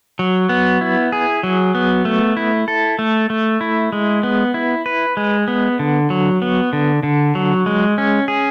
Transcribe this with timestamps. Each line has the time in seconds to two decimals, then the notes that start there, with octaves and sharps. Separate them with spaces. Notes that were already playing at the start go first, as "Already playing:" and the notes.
0.19 F#3
0.49 B3
0.81 E4
1.12 G#4
1.43 F#3
1.75 B3
2.05 A3
2.37 E4
2.68 A4
2.99 A3
3.30 A3
3.61 E4
3.92 G#3
4.23 B3
4.54 E4
4.86 B4
5.17 G#3
5.48 B3
5.79 D3
6.10 F#3
6.42 B3
6.73 D3
7.03 D3
7.35 F#3
7.66 G#3
7.98 C#4
8.28 G#4